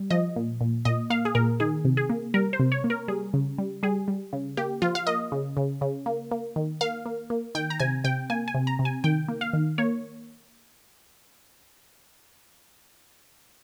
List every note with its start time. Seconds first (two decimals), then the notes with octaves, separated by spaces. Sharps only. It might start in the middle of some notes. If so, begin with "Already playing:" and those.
Already playing: G3
0.10 F3 D#5
0.36 A#2
0.61 A#2
0.85 A#2 D#5
1.10 A#3 F5
1.25 G#4
1.35 A#2 A#4
1.60 D#3 G#4
1.85 C3
1.97 G#4
2.10 A#3
2.34 G3 A#4
2.53 C5
2.59 C3
2.72 C#5
2.84 A#3
2.90 A#4
3.08 G3 G#4
3.34 C#3
3.58 G3
3.83 G3 G#4
4.08 G3
4.33 C#3
4.57 A#3 G4
4.82 F3 F4
4.95 F5
5.07 A#3 D#5
5.32 C#3
5.57 C#3
5.81 C#3
6.06 A#3
6.31 A#3
6.56 D#3
6.81 A#3 F5
7.06 A#3
7.30 A#3
7.55 D#3 G5
7.70 A#5
7.80 C3 G#5
8.04 C3 G5
8.30 A#3 G#5
8.48 G#5
8.55 C3
8.67 A#5
8.79 C3
8.85 G#5
9.04 D#3 G5
9.28 A#3
9.41 F5
9.53 D#3
9.78 A#3 C#5